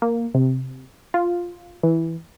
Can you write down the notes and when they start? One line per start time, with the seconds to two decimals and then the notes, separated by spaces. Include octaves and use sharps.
0.02 A#3
0.34 C3
1.14 F4
1.83 E3